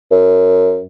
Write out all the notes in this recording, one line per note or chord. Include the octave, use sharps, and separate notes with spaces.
F#2